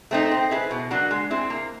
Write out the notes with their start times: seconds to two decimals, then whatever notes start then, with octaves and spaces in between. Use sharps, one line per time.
0.11 A3 C4 D#4
0.32 C4
0.51 E4 G#4 B4
0.71 B2
0.91 F#3 A#3 D4 F#4
1.11 G#3
1.30 C4 E4 G#4
1.50 A#3